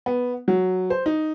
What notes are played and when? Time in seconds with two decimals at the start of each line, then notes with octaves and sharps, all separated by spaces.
0.06 B3
0.48 F#3
0.90 C5
1.06 D#4